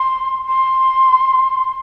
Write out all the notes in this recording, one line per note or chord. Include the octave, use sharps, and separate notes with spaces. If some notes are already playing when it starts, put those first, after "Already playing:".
Already playing: C6
C6